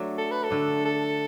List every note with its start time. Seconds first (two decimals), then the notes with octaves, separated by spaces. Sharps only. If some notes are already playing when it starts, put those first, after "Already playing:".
Already playing: F#3 A3 D4
0.18 A4
0.31 B4
0.44 A4
0.51 D3 A3 D4
0.85 A4